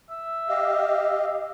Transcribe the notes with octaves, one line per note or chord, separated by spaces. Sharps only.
E5
G4 D#5 F5